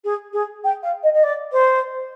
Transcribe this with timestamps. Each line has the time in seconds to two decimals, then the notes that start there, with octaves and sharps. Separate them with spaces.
0.04 G#4
0.33 G#4
0.64 G5
0.83 F5
1.03 D#5
1.13 D#5
1.23 D5
1.52 C5